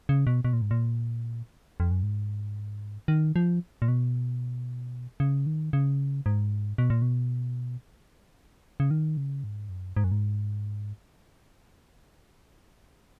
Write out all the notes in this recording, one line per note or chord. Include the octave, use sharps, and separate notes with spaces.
C#3
B2
B2
A#2
G#2
A#2
F2
F#2
G#2
D#3
F3
A#2
B2
C#3
D#3
C#3
G#2
B2
A#2
B2
C#3
D#3
C#3
G#2
F#2
G#2
F#2
G#2